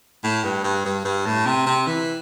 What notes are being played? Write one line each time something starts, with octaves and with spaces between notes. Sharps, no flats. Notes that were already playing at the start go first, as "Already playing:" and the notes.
A2
G2
G2
G2
G2
A2
C3
C3
E3